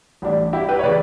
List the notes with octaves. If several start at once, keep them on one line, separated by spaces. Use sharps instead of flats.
A1 A2 G3 D4
E4 G4
G4 B4
C#5
C#3 E3 B4 D5